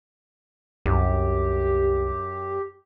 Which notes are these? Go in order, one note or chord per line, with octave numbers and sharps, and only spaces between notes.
C2 F#2 G4